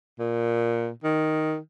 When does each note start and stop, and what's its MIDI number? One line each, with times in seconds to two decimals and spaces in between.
0.19 0.90 46
1.04 1.58 51